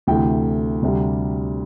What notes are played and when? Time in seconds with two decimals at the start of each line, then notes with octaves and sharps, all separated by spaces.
0.07 D2 C3 E3 A3 G5
0.82 D2 C3 G3